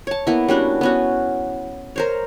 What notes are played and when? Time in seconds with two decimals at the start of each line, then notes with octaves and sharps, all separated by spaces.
0.07 C#5 A5
0.27 A#3 B3 E4
0.48 G3 C#4 D4 F#4
0.81 B3 C#4 F#4
1.96 A#4 C5 C#5